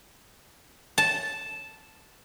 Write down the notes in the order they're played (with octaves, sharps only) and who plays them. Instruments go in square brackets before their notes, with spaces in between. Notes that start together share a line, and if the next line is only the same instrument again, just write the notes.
[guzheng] A5